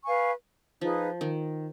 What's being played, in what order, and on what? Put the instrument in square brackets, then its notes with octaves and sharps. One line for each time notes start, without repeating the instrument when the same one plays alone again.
[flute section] B4 F5 G#5 C#6
[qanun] F3 [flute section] D#4 G#4 B4 F5
[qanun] D#3